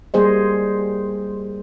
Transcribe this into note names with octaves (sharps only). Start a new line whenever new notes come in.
G3 A#3 G#4 C5 D#5